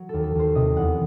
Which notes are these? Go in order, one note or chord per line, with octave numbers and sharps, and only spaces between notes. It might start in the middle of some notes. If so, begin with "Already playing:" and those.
Already playing: F#3
D#2 A4
A4
D#2 C5
C3 D#5
E2 F#5